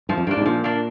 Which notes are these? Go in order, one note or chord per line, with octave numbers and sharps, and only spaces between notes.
G2 F3
F2
G2 A#3 D4
G#2
C3
A#2 F3
A#3 D4